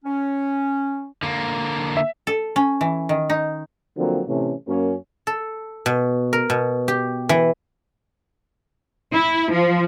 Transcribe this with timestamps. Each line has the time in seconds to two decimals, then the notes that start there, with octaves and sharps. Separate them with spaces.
0.05 C#4
1.23 D3 A#3
1.97 E5
2.27 A4
2.56 C#4
2.81 E3
3.09 D#3
3.30 D#4
3.97 D3 F3 F#3 A#3 C4
4.28 A2 C3 E3 A3 C#4
4.68 F#2 A#3 C#4
5.27 A4
5.86 B2
6.33 A#4
6.50 B2
6.88 G4
7.29 E3
9.13 E4
9.51 F3